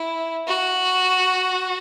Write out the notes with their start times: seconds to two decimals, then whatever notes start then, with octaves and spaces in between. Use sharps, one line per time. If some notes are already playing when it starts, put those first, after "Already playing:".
Already playing: E4
0.48 F#4